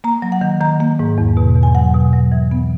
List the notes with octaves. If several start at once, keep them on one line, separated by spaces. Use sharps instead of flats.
A#3 A#5
F#3
F#5
D#3
D#3 A#5
A#3
G#2
E2
B2
E2
G#5
F#3 F#5
B2
F#3
E3
B3